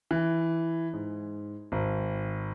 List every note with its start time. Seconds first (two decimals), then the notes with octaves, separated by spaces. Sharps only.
0.11 E3
0.93 G#2
1.72 G#1